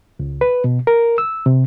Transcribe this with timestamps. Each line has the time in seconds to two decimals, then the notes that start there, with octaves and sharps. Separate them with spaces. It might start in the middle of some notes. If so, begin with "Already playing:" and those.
0.19 C#2
0.41 B4
0.64 B2
0.87 A#4
1.18 E6
1.46 C3